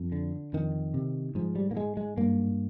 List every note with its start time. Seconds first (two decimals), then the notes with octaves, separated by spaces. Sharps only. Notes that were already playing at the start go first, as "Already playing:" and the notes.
Already playing: F2
0.12 D3
0.53 F2 D#3
0.94 C3
1.35 G#2 F3
1.56 G3
1.71 A#3
1.76 G#2 G#3
1.97 G#3
2.17 G2 A#3